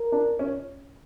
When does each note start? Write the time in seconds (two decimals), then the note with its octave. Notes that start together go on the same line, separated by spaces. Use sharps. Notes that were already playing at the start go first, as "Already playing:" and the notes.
Already playing: A#4
0.12 D4
0.39 C#4